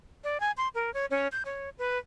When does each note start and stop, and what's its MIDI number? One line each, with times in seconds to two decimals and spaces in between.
0.24 0.40 74
0.40 0.52 80
0.57 0.68 84
0.75 0.93 70
0.94 1.06 73
1.11 1.28 61
1.32 1.43 91
1.45 1.70 73
1.79 1.98 71